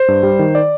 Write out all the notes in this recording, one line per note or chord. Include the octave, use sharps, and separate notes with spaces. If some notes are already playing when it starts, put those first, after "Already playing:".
Already playing: C5
G2
G3
D#3
D5